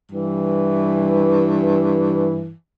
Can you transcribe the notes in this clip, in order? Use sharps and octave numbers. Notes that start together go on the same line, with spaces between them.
G2 E3